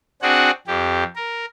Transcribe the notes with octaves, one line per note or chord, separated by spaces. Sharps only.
C4 D4 F#4 G#4 F#5
F2 G4
A#4